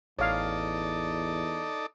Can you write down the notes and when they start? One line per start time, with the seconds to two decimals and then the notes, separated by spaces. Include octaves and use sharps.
0.19 A1 E2 D#4 A4 C#5 D5 F5